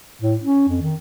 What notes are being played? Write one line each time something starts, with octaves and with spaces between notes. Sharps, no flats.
A2
C#4
F2
D#3